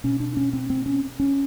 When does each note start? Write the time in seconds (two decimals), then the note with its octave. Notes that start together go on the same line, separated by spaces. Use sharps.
0.04 B2 C#4
0.20 D4
0.37 C#4
0.53 C4
0.70 C4
0.86 C#4
1.20 C#4